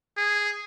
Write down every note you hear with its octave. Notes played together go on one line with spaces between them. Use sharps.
G#4